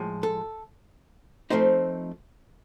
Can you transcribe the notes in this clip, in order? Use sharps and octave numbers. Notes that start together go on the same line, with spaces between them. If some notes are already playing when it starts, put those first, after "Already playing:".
Already playing: A2 F3 G#3
A4
F3 A3 C4 D#4 C5